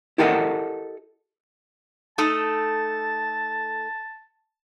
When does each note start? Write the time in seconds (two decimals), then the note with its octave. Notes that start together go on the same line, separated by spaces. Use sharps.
0.18 E4 G4 A4 A#4 D#5 F#5
2.18 A3 D#4 A4 A5